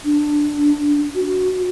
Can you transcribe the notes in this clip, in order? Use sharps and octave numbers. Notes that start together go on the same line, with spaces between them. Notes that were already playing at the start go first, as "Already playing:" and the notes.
D4
F#4